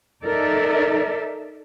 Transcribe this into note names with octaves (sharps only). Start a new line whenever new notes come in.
D#4 A4 A#4 D5 E5